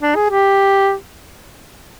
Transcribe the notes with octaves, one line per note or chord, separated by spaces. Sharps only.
D4
G#4
G4